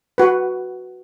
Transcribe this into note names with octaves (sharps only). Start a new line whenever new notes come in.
F#4 B4